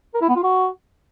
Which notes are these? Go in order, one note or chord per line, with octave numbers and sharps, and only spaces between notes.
A#4
E4
B3
F4
F#4